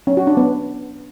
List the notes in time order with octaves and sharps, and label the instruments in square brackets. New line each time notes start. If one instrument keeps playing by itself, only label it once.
[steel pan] C#4
F#4
D4
B3